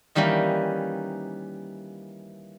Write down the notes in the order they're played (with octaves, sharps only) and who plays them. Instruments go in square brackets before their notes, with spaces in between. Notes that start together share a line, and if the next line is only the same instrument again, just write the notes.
[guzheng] D#3 E3 G3 A#3 C#4